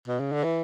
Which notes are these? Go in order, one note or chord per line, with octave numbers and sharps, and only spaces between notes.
B2
C#3
D3
E3